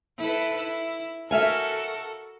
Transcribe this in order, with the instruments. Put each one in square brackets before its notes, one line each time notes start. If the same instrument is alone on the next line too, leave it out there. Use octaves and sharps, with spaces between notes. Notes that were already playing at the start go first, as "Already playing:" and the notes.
[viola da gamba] E4 A4 B4
E4
[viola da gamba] F#4 A4 A#4 [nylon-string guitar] E5 F5 G#5